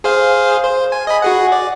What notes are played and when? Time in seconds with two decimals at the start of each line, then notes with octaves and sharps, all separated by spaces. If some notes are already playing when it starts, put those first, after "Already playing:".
0.04 G#4 C5 F5
0.64 C5
0.92 G#5
1.07 D#5 G#5 B5
1.22 F#4 G#4 F#5
1.52 D5